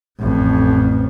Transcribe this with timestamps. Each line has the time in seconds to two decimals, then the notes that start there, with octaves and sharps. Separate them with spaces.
0.19 A1 F2